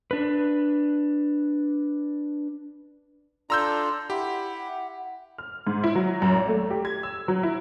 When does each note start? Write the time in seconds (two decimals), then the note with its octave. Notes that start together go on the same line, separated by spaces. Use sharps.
0.11 D4 B4
3.50 D4 F4 A4 A#5 C6 E6 G6
4.10 E4 G4 F#5
5.38 F6
5.67 G#2
5.84 E4
5.95 F#3
6.22 F#2
6.35 G#1
6.48 A3
6.71 G4
6.85 G#6
7.03 E6
7.28 F#3
7.43 E4